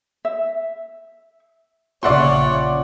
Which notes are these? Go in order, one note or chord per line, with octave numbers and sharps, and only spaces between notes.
E5
A#1 C#3 F4 C#5 D5 E5 F#5 C6